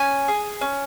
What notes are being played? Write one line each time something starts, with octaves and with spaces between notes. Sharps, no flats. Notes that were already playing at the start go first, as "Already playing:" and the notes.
Already playing: C#4 G#5
G#4
C#4